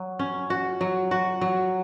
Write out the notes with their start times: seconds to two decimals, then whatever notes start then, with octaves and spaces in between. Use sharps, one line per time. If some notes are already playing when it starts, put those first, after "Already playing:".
Already playing: F#3
0.19 C#4
0.50 F#4
0.81 F#3
1.11 F#4
1.41 F#3